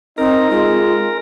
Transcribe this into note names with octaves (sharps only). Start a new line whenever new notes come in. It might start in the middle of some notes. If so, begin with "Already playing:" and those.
C4 D#4 A#4
G#3 F4